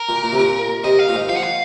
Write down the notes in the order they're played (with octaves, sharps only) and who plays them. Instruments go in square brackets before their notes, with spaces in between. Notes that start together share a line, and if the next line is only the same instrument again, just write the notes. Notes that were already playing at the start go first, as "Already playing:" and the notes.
Already playing: [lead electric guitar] A#4
[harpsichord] A#2
A#2
C3
A#2
[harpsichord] C3 [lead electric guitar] D#5
[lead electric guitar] F5
[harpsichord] A#2
G#2
[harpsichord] F3 [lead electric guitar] F5
[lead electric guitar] F#5
F5